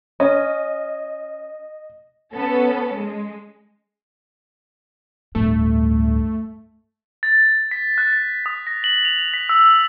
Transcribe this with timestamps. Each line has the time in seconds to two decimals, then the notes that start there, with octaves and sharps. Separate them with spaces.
0.20 C#4 D#5
2.33 B3 C#4 A4
2.96 G#3
5.35 D1 G2 A3
7.23 A6
7.71 B6
7.98 F#6
8.13 A6
8.46 D#6
8.67 A#6
8.84 F#7
9.05 F7
9.34 B6
9.49 E6
9.68 F#7